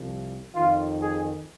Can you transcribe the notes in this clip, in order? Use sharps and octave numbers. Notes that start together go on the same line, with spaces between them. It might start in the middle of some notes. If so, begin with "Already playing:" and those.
Already playing: C2 C3 F3
F2 D#3 F4
G#4